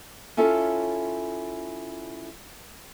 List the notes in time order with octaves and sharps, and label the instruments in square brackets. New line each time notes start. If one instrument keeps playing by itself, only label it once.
[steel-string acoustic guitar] C#4 E4 F4 A4 C#5